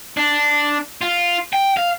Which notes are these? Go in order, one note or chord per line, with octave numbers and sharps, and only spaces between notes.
D4
F4
G5
F5